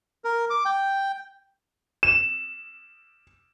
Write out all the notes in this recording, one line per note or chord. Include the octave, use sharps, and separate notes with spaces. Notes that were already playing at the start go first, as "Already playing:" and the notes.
A#4
D6
G5
E7